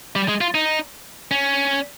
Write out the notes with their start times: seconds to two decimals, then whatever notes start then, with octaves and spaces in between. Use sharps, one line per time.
0.16 G3
0.28 G#3
0.41 F4
0.55 D#4
1.31 C#4